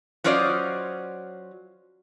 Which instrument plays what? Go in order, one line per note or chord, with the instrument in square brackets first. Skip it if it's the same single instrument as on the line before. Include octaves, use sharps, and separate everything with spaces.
[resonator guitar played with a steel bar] F#3 C#4 F4 C5 D5 D#5